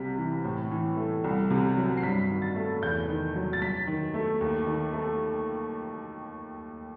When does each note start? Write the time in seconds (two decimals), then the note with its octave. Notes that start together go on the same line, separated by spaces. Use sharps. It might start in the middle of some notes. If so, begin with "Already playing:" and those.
Already playing: C2 C3 B6
0.18 E3
0.44 A2
0.71 E3
0.97 A3
1.24 C2
1.50 C3
1.76 F#3
1.97 C7
2.02 G2 B6
2.30 D#3
2.42 A6
2.56 A3
2.82 E2 G6
3.09 D#3
3.35 F#3
3.53 A6
3.62 F#2 B6
3.87 D#3
4.14 A3
4.41 D#2
4.67 D#3
4.94 A3